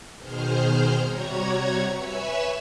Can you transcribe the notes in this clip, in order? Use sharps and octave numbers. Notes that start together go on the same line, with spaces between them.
B2 D#3 G#4 C5 F6 G6
C3 G3 F#4 C#5 A#5 G#6
B4 C#5 E5 G#5 E6